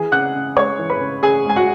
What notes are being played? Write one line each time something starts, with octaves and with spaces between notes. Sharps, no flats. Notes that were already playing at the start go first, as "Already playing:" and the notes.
Already playing: E3 G#4 G#5
C#3 F#5 F#6
C#3
G#3 C#5 C#6
E3
B4 B5
C#3
C#3 G#4 G#5
G#3 G#5
F#4 F#5